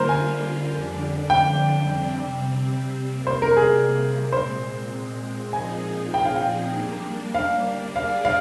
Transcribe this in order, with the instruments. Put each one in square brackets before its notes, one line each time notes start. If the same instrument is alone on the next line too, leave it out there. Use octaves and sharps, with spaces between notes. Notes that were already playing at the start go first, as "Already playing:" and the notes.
Already playing: [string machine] D3 G3 A#3 F4 [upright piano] A#4 C5
[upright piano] G#5
[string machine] F2 D3 G3 D4
[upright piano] G5
[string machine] C3 G3 C4
C3 G3 A#3
[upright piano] C5
A#4
G#4
[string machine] A#2 G#3 C4 [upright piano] C5
[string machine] A#2 F3 C4 D#4 G#4 [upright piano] G#5
[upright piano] G5
F5
G5
[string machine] G3 A#3 D4
[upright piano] F5
[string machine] G3 D4 G#4 D5 [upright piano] F5
[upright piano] F5